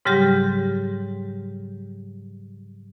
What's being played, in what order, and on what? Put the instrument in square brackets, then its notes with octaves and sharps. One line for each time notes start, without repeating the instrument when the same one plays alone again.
[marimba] G#2 C#3 F#3 G3 G4 G6